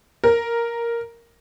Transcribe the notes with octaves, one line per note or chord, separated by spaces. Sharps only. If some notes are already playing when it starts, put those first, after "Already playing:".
A#4